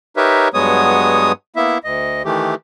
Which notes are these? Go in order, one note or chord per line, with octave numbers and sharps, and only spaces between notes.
D#4 G4 A#4 B4 C#5 E5
G2 F#3 G#3 B3 C#5 D#6
A#3 B3 E4 E5
D2 D#5
D#3 E3 A3 G4